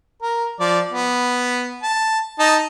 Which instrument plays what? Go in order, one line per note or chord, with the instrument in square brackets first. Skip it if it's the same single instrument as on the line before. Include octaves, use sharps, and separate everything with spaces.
[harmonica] A#4
F3 D5
B3
A5
D#4 A5